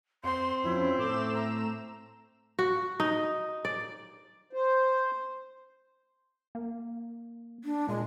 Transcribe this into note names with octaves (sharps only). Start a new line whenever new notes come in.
F2 C4 C6
F2 F3 C#4 E4
A2 A3 D6 E6 E7
A#5
F#4
D#4
D5
C5
A#3
D4
A#2 G#3